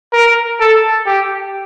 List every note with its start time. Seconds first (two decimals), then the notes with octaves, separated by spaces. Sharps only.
0.13 A#4
0.60 A4
1.06 G4